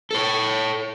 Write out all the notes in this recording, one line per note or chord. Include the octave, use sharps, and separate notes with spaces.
A4 C#5